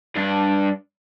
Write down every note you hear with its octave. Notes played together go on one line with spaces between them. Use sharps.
G2 D4